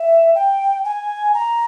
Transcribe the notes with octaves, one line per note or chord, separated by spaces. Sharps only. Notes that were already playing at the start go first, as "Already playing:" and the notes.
Already playing: E5
G5
G#5
A#5